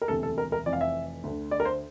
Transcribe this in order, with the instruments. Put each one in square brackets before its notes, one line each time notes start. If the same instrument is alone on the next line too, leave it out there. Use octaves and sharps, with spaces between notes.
[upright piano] A#4
E1 D2 C3 E3 A4
A4
A#4
A#4
F1 F2 E3 D5
F5
E5
D2 D3
D5
A#4
C5